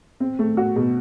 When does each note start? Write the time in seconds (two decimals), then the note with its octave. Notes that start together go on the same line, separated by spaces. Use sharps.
0.20 C4
0.39 A3
0.57 F#4
0.76 B2